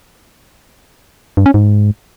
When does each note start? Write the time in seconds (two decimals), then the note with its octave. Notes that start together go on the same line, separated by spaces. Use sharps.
1.37 G2
1.46 C#4
1.54 G#2